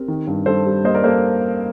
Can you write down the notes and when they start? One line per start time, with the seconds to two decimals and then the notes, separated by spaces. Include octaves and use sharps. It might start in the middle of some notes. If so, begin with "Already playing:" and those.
Already playing: C4 G4 A#4
0.08 D#3
0.27 G2
0.46 G2 A4 C5
0.66 G3
0.84 A#3 C5 D#5
0.94 A#4 D5
1.04 A#3 A4 C5